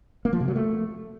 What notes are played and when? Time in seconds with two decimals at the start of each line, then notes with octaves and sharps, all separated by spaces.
0.25 A#3
0.33 F3
0.40 C3
0.48 F#3
0.56 A3